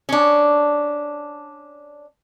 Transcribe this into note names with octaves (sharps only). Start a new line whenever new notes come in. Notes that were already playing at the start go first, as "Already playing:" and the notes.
C#4 D4